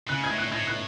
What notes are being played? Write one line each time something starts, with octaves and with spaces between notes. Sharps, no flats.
C#3 F#6
G#6
A2
F#6
A2 G#6
F#6